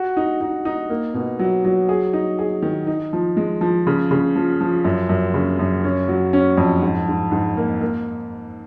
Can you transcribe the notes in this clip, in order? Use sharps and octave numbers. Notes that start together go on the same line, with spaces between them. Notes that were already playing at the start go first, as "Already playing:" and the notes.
Already playing: F#4
D#4
D#4
D#4
A#3
B2
F#3
F#3
G#4
D#4
G#4
D#3
D#4
F3
G#3
F3
C#3
C#3
F3
F3
F#2
F#2
C#3
F#2
C#4
F#3
C#4
F2
G#2
G#2
G#2
A#3
A#3